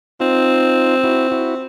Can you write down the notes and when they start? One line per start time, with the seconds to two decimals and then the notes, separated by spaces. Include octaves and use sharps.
0.20 C4 D#4 F4
1.04 E4 F#4
1.31 E4 F#4